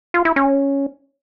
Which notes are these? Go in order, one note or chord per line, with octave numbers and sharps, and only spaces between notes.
F4
E4
C#4